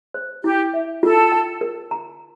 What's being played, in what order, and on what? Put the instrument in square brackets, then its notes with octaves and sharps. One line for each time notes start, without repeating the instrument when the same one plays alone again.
[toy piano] C5
[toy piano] E4 [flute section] G4
[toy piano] E5
[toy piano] F4 [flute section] A4
[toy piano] G5
A#4
A#5